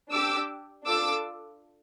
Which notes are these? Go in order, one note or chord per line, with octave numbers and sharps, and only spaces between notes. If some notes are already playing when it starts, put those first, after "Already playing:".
D4 G4 D6 E6
D4 F4 A4 D6 E6